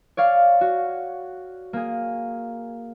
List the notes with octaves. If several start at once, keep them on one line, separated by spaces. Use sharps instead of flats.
C#5 D5 F5
F#4
A#3 G#4